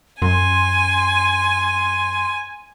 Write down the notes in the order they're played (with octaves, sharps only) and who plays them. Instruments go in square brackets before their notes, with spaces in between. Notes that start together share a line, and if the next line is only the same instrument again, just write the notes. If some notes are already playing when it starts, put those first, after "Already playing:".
[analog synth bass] F#2 [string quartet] G#5 [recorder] C6